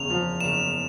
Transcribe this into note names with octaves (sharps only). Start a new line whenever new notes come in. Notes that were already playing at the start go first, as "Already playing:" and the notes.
Already playing: F#1 E2 C#3 F7
F3
F#1 E7